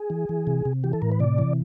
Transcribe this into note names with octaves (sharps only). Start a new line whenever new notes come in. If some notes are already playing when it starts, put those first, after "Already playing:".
Already playing: G#4
E3
E3
C3
C3
E3 G4
A4
A2 A#4
B4
C3 D5
E3